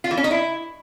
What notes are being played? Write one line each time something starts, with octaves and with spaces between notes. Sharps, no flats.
F4
E3
C#4
D#4
E4